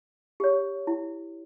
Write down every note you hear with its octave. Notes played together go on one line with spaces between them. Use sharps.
G4 C#5
E4